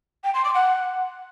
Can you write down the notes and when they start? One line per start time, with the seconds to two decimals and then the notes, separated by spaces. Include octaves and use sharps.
0.24 G5
0.34 C6
0.44 D6
0.54 F#5